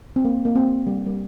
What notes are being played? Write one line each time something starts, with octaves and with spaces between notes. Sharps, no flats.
C4
A#3
A#3
C4
G3
G3